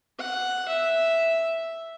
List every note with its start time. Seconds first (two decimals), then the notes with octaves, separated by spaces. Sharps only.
0.19 F#5
0.68 E5